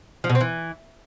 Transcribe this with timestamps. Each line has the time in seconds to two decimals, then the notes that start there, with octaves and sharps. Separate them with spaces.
0.24 F3
0.30 B2
0.35 C4
0.41 E3